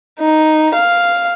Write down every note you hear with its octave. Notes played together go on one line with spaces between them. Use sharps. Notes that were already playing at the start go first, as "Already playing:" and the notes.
D#4
F5